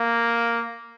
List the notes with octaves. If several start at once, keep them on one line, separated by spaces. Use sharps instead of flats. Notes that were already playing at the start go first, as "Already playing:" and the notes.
Already playing: A#3